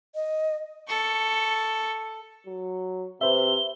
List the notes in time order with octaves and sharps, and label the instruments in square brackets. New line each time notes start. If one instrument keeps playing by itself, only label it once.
[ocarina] D#5
[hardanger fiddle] A4 C#6
[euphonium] F#3
[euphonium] C3 [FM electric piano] B4 C5 E5 [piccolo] G7